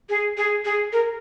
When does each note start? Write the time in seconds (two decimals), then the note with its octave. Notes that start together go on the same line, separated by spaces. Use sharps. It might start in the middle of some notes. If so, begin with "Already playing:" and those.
0.09 G#4
0.37 G#4
0.65 G#4
0.93 A#4